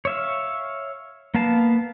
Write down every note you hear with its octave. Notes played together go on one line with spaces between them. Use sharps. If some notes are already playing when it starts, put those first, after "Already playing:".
C#5 E5 F5
A#3 B3 F5 A5